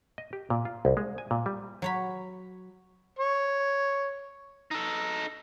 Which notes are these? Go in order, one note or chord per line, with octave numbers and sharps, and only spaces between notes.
D#5
G4
A#2
F4
C2
G#3
G#5
A#2
G3
F#3 C#5 B5
C#5
D#4 A4